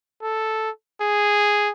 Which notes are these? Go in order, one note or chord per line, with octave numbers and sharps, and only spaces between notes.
A4
G#4